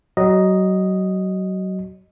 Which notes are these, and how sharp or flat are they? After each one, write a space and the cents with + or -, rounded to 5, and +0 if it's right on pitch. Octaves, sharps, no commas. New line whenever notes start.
F#3 +25 D#5 +0